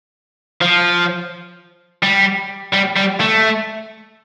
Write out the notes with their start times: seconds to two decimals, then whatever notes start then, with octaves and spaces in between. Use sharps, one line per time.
0.62 F3
2.03 G3
2.74 G3
2.97 G3
3.20 A3